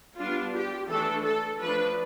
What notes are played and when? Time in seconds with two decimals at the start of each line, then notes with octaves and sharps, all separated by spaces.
0.19 G3 B3 D4 F4
0.55 G4
0.90 E3 A3 D4 A4
1.26 A4
1.61 F3 A3 D4 B4